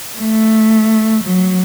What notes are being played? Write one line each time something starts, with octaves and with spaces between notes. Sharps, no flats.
A3
F#3